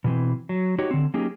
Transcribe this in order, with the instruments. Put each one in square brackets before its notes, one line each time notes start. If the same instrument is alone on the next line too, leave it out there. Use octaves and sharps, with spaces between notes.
[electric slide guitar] B2 E3 C4
F#3
D#4 F#4 G4 C#5
D3 C4
F#3 A#3 C#4 D#4 G4 G#4